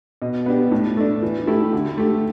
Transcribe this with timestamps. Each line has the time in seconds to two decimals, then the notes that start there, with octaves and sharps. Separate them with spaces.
0.22 B2
0.46 B3 D4 G4
0.71 A2
0.97 A3 D4
1.22 E3
1.47 A3 E4 G4
1.73 D3
1.98 A3 G4